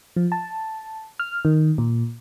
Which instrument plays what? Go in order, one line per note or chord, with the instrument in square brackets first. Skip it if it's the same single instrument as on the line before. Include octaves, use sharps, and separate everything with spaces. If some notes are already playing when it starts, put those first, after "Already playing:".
[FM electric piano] F3
A5
F6
D#3
A#2